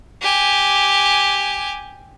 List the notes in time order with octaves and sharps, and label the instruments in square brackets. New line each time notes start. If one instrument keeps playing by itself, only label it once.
[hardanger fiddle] G4 G#5